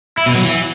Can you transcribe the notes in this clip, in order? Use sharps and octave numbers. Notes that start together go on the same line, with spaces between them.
E4
B2
F#3
E3